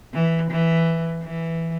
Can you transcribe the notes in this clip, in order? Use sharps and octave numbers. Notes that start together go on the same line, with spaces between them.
E3
E3
E3